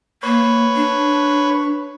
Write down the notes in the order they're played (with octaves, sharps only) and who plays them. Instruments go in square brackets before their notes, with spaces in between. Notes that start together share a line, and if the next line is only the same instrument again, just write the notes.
[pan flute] A#3 [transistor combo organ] B4 C#5
[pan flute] D4